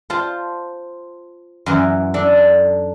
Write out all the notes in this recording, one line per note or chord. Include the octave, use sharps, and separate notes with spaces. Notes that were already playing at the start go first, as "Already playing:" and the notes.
F4 C5 A5
F#2 E3
D4 A4